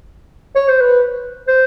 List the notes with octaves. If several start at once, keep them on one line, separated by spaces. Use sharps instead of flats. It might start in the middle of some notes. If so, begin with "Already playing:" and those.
C#5
C5
B4
C5